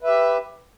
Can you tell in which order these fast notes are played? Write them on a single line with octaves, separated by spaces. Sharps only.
B4 E5 G4